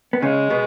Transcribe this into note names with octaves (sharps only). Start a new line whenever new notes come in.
B3
C#3 G#3 C#4
B2 B3